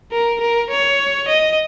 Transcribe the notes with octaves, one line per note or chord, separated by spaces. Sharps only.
A#4
A#4
C#5
D#5